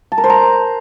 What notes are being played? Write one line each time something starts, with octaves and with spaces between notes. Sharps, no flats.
A5
A#4
C5
A#5